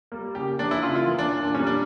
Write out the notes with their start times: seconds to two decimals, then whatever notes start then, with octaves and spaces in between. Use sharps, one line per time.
0.12 G3 A#3
0.35 C#3 G4
0.59 E3 A#3 D4
0.71 E4
0.83 C#3 F4
0.95 F4
1.07 E3 A#3
1.18 D4
1.30 A#2
1.43 D4
1.54 G3 C#4
1.58 A#3
1.67 D4